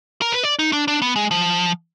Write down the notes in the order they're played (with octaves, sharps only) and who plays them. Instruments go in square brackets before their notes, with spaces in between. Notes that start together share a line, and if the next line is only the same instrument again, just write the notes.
[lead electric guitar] A#4
B4
D5
D#4
D4
D4
B3
G#3
F3